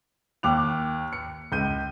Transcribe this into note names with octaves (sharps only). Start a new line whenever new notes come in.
D#2 D6 F#6 F7
C#7
C#2 G6 D#7